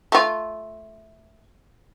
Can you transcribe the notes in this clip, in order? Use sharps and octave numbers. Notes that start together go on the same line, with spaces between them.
A3 F4